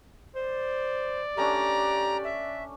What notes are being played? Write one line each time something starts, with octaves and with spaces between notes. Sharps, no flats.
C5 D5
A3 C#4 D4 G4 A#5
E5